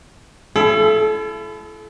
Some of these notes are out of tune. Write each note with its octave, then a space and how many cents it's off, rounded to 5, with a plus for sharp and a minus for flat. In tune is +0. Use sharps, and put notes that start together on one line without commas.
E4 +35 A4 -30